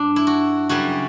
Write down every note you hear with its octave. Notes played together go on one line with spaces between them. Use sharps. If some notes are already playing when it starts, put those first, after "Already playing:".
Already playing: G2 D4
E4
F#4
F#2 C#3 G3 F#4